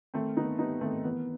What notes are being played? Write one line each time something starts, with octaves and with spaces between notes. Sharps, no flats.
D#3 A3 C4
D#3 B3 D#4
G3 B3 D#4
D#3 A3 C4
E3 B3